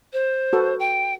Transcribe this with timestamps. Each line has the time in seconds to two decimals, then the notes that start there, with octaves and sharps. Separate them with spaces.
0.13 C5
0.53 F#4 A4 B4
0.80 G5